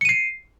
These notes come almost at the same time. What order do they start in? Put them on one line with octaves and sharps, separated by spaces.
C#7 D#7 C7